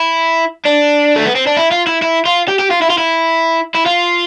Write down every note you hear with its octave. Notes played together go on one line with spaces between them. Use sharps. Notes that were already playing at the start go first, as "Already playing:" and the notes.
Already playing: E4
D4
A3
B3
C4
D4
E4
F4
E4
E4
F4
G4
G4
F4
E4
F4
E4
E4
F4